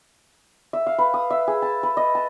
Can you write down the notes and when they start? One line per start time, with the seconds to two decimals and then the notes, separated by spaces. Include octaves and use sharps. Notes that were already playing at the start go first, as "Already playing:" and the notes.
0.73 E5
0.87 F5
0.98 B4
1.14 D#6
1.30 E5
1.48 G#4
1.62 A5
1.83 B4
1.97 D#5
2.15 A5